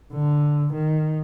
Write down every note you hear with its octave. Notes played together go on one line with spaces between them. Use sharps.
D3
D#3